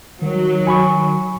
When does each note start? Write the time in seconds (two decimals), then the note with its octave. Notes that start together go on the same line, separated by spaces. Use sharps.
0.22 D#3 F#3
0.67 G#5 B5 C#6